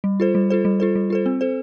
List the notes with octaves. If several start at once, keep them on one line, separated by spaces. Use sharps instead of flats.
G3
F4 A4 C5
G3
F4 A4 C5
G3
F4 A4 C5
G3
F4 A4 C5
C4
A4 C5